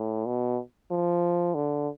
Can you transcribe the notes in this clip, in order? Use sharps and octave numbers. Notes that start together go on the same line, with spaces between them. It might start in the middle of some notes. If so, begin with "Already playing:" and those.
Already playing: A2
B2
F3
D3